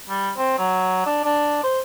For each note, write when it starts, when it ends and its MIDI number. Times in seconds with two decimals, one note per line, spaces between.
0.09 0.31 55
0.37 0.58 60
0.58 1.05 54
1.06 1.21 62
1.24 1.59 62
1.64 1.80 72